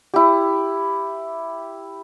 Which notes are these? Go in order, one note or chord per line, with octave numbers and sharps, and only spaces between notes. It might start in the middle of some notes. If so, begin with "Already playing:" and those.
E4 G4